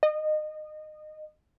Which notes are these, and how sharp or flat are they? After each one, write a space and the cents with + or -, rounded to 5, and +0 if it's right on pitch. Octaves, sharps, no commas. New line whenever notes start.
D#5 -25